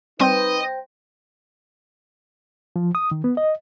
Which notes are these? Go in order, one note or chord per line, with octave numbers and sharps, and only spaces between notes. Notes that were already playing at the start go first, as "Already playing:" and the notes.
G3 C4 D#4 B4 C5 D#5 G5 C6
F3
D#6
D#3
B3
D#5